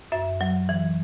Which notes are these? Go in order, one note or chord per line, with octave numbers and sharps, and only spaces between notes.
F#2 E5
F#3
E3